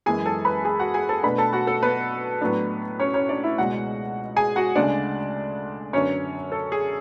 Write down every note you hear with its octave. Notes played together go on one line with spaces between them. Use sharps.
F#2 E3 G#3 B3 G#4 G#5
A4 A5
B4 B5
G#4 G#5
F#4 F#5
G#4 G#5
A4 A5
B2 A3 D4 B4 B5
A4 A5
F#4 F#5
A4
B3 B4
A2 F#3 B3 D4
C#4 C#5
C#4 C#5
D4 D5
E4 E5
C#2 B2 G#3 F#4 F#5
G#4 G#5
F#4 F#5
D2 C#3 G#3 D4 D5
F#2 D3 F#3 B3 C#4 D4 C#5
A4
G#4